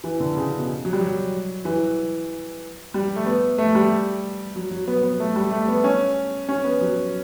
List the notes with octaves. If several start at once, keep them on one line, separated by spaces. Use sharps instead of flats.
E3
D3
C#3
B2
F#3
G3
F#3
E3
G3
A3
B3
A3
G3
F#3
F#3
B3
B3
A3
G3
A3
B3
C#4
C#4
B3
F#3